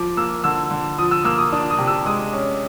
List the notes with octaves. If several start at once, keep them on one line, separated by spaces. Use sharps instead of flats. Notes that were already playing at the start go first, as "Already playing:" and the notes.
Already playing: F3 D6
A#3 E6
D3 E6
D3
F3 D#6
E6
A#3 E6
D#6
D4 D#6
D#6
C3
E6
G#3 D#6
C#4